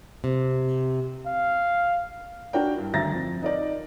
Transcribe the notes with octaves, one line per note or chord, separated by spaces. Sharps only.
C3
F5
D4 F#4 A#4 D5 F#5 G5
G2 E4
G#1 D2 E5 A#5 A6 A#6
F2
D#4 A#4 D5